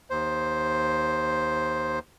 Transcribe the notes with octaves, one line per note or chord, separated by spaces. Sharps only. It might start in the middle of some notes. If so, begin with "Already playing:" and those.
D#2 C5